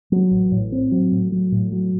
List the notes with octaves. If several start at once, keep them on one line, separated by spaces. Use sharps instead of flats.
F#3
A1
A2
C4
F#3
A2
F#3
A2
F#3